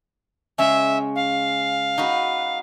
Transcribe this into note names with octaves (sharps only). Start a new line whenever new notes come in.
C#3 G#3 C#4 E5
F5
D#4 F#4 B4